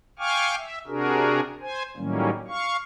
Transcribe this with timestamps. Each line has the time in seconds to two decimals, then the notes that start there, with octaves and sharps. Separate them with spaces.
0.19 F5 G5 G#5 C#6 D6 F6
0.57 E5
0.87 C3 D4 F#4 G#4 A#4
1.61 C5 G#5
1.97 A2 D#3 F#3 G3 A#3 C#4
2.48 F5 C#6